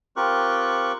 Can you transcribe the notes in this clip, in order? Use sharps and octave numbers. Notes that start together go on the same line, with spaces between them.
C4 F4 G4 A#4 C#6 F#6